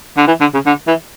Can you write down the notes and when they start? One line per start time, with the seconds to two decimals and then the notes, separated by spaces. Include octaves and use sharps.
0.17 D3
0.27 E3
0.41 D3
0.54 C#3
0.66 D3
0.87 E3